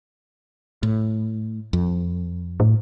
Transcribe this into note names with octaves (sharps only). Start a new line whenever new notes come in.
A2
F2
A2